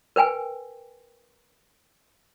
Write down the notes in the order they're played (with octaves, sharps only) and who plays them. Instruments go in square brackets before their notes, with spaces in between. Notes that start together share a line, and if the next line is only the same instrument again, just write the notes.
[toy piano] A#4 B4 G5 G#5